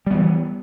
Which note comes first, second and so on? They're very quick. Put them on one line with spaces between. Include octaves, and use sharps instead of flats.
G3 B3 E3